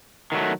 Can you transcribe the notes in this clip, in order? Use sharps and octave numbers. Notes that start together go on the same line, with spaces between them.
D#3 F#3 A3